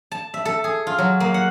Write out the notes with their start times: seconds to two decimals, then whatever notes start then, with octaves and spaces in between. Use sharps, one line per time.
0.12 A5
0.34 E5
0.45 A4
0.64 G#4
0.87 F4
0.98 F#3
1.20 A#3
1.34 F#5